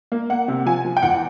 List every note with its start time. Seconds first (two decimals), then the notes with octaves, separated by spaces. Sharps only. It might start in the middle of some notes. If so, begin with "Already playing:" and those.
0.12 A#3
0.30 A#3 F#5
0.48 C3
0.66 F3 G#5
0.85 F3
0.97 G5
1.02 E2 F#5